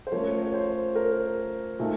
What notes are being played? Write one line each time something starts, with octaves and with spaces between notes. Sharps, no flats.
C5
F3 A3 C#4 A#4 C#5
C#5
C5
A#4
A#2 A3 D#4